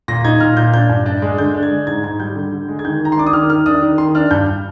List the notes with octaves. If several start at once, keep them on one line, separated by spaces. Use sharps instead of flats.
A#2 A#6
D#4 G#6
A#2 F6
A#2 G6
D4 G6
G2
D4
G#3
D3 G6
D4
G#6
G#3
G#2 G#6
G#2 G#6
G3 G6
D3
D3
G#3
G#6
D#3 G6
D#3 A#5
C6
D4 D6
D#6
D#3 F6
D#3 F6
D4 D#6
D#3
D#3 C6
D4 F6
G2 G6